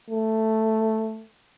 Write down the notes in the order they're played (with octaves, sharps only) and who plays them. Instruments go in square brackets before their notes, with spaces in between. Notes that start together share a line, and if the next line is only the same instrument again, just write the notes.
[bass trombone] A3